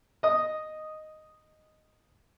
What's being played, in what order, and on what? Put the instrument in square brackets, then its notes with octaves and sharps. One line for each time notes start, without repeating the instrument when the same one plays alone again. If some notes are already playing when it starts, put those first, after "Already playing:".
[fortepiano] D#5 D#6